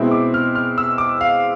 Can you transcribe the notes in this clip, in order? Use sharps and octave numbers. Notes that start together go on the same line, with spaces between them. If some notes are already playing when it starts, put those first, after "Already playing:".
Already playing: B2 G#3 C4 E4
D6
F6
F6
E6
D6
F5